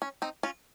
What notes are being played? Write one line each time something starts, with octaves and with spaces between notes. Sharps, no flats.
C#4
C4 D#4
C#4 F4